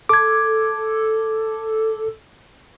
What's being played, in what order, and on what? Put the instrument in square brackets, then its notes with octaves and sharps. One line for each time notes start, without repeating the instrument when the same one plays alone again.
[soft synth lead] A4 [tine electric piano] D6 G#6